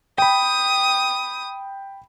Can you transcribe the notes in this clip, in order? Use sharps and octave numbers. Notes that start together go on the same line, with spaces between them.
G5 B5 D#6